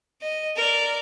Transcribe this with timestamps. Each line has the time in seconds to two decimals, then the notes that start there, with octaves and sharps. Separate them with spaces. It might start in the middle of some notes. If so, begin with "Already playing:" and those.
0.22 D#5
0.56 A#4 D5